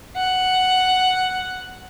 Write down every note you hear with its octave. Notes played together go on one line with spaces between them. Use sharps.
F#5